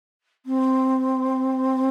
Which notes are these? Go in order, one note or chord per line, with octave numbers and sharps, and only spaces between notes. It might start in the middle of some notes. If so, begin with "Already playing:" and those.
C4